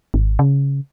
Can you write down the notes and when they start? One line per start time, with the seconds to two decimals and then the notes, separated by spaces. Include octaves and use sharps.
0.14 G#1
0.39 C#3